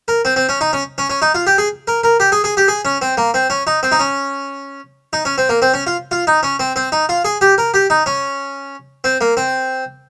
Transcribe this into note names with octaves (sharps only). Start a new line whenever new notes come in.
A#4
C4
C4
C#4
D#4
C#4
C#4
C#4
D#4
F4
G4
G#4
A#4
A#4
G4
G#4
G#4
G4
G#4
C#4
C4
A#3
C4
C#4
D#4
C4
D#4
C#4
D#4
C#4
C4
A#3
C4
C#4
F4
F4
D#4
C#4
C4
C4
D#4
F4
G#4
G4
A#4
G4
D#4
C#4
C4
A#3
C4